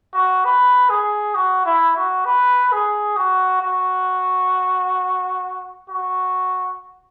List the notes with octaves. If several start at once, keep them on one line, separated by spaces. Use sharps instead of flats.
F#4
B4
G#4
F#4
E4
F#4
B4
G#4
F#4
F#4
F#4